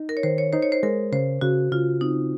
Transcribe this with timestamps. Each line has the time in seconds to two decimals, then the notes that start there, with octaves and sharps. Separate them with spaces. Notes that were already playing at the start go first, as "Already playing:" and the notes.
Already playing: D#4
0.09 A#4
0.17 C#5
0.23 D#3 C5
0.38 C#5
0.53 D#4 C5
0.63 C#5
0.72 C5
0.83 G#3 A#4
1.12 C#3 C5
1.41 C#3 F#4
1.72 C#3 F4
2.01 C4 D#4